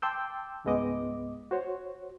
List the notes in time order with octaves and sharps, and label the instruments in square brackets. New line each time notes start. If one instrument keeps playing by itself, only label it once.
[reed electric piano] G5 A5 C6 D6 E6 G6
C#2 G#2 G#3 B3 D#5 D6
F#4 C5 C#5